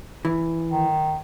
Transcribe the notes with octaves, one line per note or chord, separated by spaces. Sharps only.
E3
D#3